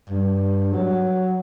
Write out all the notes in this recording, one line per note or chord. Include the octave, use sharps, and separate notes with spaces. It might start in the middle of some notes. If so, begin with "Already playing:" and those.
G2
F#3